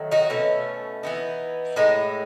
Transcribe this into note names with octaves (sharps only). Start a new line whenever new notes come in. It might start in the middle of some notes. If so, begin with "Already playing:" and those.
Already playing: D#3 F#3 A3
D#4 F#4
B2 A3 C#4
E3 B3 D#4
A2 G#3 D#4